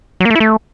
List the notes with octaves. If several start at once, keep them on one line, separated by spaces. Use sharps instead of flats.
F#3
A#3
A3
E4
A3